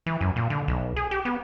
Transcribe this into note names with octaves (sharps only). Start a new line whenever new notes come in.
E3
F#2
A#2
D3
B1
G#4
G4
B3